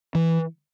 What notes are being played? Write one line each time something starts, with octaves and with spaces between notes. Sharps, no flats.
E3